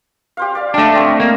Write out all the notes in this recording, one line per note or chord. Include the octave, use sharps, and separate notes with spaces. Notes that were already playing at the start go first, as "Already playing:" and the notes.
G4 C5 F5
D5 F5
G3 A3 D4 D#5
C4 C#5
A#3